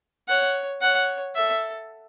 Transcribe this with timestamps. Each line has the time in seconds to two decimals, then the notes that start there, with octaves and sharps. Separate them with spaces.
0.28 C#5 F#5
0.81 C#5 F#5
1.35 A4 E5